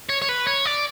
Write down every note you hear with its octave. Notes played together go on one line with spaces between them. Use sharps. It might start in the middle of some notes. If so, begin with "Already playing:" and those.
C#5
C#5
B4
C#5
D5